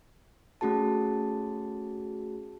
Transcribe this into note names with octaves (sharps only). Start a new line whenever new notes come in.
A3 C#4 F#4 G#4 A5